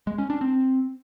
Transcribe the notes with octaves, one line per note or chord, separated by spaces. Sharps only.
G#3
C#4
D4
C4